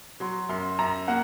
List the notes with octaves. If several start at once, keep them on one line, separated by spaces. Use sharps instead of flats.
F#3 C6
F#2 C6
F#2 A#5
A#3 F#5